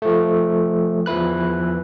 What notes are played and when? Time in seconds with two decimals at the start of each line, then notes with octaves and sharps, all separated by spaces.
0.02 F3 A3
1.06 E2 F3 E4 B4 F#6